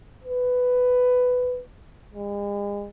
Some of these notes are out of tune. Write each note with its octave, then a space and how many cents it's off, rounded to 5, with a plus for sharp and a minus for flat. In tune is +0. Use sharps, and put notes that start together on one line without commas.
B4 +10
G#3 -40